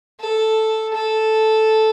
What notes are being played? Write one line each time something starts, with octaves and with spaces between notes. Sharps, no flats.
A4
A4